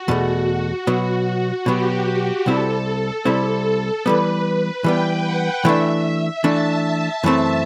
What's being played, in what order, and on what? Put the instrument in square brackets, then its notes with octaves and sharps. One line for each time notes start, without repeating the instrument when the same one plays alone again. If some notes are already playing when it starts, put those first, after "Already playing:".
Already playing: [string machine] F#4
[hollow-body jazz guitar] E2 B2 A3
B2 F#3 B3
[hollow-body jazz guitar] B2 F#3 B3 [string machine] G4
[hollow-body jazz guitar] C2 C3 G3 C4 E4 [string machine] A4
[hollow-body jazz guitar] C2 C3 G3 C4 E4
[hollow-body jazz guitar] E3 G3 B3 [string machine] B4
[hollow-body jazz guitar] E3 G3 B3 [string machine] G5
[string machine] F#5
[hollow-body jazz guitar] E3 A3 D4 [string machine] E5
[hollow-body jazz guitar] E3 A3 D4 [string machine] A5
[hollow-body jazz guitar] F#2 E3 A3 C4